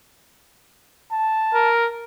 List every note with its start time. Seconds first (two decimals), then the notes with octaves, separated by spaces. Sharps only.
1.12 A5
1.54 A#4